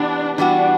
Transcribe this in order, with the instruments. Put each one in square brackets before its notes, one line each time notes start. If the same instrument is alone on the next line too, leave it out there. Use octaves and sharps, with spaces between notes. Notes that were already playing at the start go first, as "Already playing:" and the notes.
Already playing: [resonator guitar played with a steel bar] C3 E3 B3 [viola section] D4
[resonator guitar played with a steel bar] E3 G3 B3 F#4 [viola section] D4